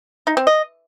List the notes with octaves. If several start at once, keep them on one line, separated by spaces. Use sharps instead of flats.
D#4
C4
D#5